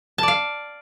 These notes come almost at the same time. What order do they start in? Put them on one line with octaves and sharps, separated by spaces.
A5 D5 F5